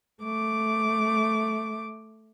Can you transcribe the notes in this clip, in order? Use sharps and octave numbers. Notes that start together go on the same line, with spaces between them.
A3 D6